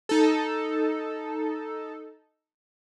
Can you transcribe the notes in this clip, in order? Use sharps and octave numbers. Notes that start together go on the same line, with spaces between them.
D#4 A4